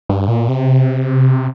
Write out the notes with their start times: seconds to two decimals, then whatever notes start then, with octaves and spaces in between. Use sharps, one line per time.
0.09 G2
0.28 A#2
0.48 C3